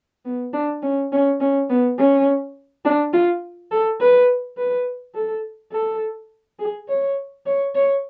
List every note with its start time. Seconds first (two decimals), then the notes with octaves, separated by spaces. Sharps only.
0.25 B3
0.53 D4
0.82 C#4
1.12 C#4
1.40 C#4
1.69 B3
1.98 C#4
2.85 D4
3.13 F4
3.71 A4
4.00 B4
4.57 B4
5.15 A4
5.72 A4
6.59 G#4
6.88 C#5
7.46 C#5
7.75 C#5